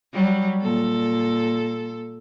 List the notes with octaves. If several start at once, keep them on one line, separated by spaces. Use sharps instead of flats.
F#3 G3
A#2 A4